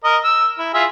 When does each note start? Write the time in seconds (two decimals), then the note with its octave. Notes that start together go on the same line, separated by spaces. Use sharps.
0.04 A#4 D#5
0.24 E6
0.58 E4
0.74 F4 G#4 E5